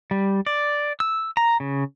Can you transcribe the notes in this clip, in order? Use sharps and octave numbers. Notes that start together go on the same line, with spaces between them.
G3
D5
E6
A#5
C#3